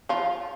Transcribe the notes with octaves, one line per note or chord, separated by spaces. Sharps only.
F3 F4